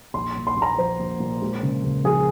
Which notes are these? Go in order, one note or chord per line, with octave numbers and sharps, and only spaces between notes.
A#1 C6
A#2
C6
A#1
A#5
F3 C5
A#1
A#2
G#3
C#3
C#2
F3 G#4